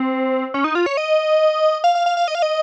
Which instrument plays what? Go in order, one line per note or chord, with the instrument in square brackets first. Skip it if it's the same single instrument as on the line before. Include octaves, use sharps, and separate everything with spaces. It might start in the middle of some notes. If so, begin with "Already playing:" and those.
Already playing: [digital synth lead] C4
C#4
D#4
F4
C#5
D#5
F5
F5
F5
F5
D#5
F5
D#5